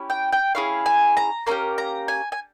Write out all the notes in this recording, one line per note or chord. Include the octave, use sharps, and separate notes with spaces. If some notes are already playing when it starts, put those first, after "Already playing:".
Already playing: C#4 E4 G4
G5
G5
C#4 E4 G#4 F5
G#5
A#5
A#3 C#4 G4 A#5
A#5
G#5
G#5